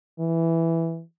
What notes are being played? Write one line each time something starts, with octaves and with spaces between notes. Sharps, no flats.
E3